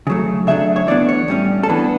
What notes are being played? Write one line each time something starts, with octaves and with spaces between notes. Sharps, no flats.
C#3 F#3 A3
C#3 F#3 A3 D4 E5
C#5
E3 B3 D4 D5
C#5
A2 G3 C#4
A4
E3 B3 D4 B4